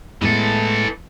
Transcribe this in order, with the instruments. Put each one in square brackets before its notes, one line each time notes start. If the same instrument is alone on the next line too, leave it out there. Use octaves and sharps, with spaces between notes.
[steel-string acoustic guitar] A2 G#3 B3 [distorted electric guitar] E3 A4